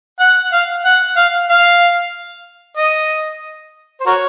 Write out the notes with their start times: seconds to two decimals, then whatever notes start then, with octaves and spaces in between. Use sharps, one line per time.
0.20 F#5
0.53 F5
0.85 F#5
1.16 F5
1.50 F5
2.77 D#5
4.00 C5
4.06 F#4 A#4 C#5